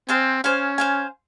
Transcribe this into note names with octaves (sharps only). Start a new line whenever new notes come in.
C4 C5 F5 G#5
C#4 C5 F5 G#5
C5 F5 G#5